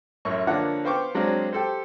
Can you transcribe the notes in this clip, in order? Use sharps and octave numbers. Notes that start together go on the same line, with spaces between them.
A1 F#2 C#5 C#6
D3 F3 A#3 C#5 D5 F#5
B3 C5 F5 G5 C#6 D6
F#3 G#3 C4 D4 F5
G4 A4 C5